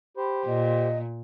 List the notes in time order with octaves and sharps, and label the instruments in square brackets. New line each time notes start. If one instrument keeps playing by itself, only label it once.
[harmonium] G4 C5 [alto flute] B5
[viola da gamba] A#2 [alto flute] D#5